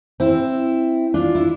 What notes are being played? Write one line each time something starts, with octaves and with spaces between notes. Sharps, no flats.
C4 E4
D4 F4
E4